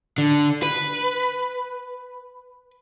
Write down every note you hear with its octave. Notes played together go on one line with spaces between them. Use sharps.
D3
B4